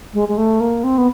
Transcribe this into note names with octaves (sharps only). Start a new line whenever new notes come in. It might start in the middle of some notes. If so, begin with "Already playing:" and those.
G#3
G#3
A3
A#3
C4
B3